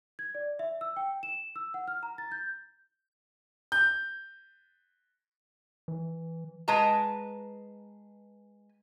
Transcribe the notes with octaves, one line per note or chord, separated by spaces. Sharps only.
G#6
D5
E5
E6
G5
E7
E6
F#5
F6
A#5
A6
G6
G6
E3
G#3 B4 A5 A#5